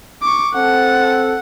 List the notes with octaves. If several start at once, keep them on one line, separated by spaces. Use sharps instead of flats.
C#6 D6
C4 A4 F#5